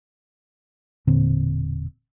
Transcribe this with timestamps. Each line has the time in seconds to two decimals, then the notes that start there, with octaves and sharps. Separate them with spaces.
1.07 E1 A#2 D3 C4